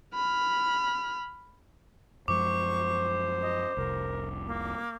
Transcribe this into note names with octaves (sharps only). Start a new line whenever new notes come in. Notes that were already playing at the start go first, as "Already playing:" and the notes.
B5 F6
F#2 F3 G#3 C5 C#6 D6
D#5
F1 C2 A#4
A#3